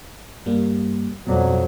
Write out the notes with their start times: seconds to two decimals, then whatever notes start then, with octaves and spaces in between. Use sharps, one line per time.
0.46 G2 G3 A#3
1.27 F2 B2 F#3 D5